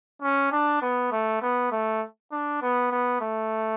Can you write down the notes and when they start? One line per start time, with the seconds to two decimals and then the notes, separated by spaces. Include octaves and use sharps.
0.22 C#4
0.52 D4
0.82 B3
1.12 A3
1.42 B3
1.72 A3
2.32 D4
2.62 B3
2.91 B3
3.21 A3